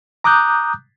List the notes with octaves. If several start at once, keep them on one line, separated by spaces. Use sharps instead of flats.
A#5 D6 D#6 F#6 G6